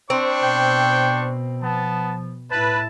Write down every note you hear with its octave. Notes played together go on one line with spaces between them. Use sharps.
C4 D4 C5 C#6
B2 G5
F3 B3 A5
A2 E4 B4 A5